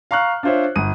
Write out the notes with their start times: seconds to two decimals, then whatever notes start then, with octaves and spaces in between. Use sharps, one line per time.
0.11 F5 A#5 C#6 F6 F#6
0.43 D4 F4 C5 C#5 E5
0.76 G1 D#6 D#7